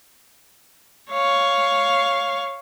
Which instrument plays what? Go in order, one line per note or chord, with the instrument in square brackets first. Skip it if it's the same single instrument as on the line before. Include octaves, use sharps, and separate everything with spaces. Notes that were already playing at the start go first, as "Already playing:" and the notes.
[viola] C#5 F5